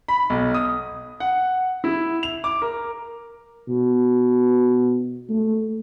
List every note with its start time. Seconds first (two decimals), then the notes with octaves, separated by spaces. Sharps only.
0.08 B5
0.30 B1
0.54 D#6
1.20 F#5
1.84 E4
2.23 F7
2.44 D6
2.62 A#4
3.68 B2
5.30 A3